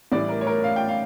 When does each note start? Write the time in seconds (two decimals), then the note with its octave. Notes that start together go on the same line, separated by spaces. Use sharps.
0.12 A2 E3 G3 D5
0.29 A#4
0.41 C#5
0.47 A#4
0.64 F5
0.76 G5
0.89 F5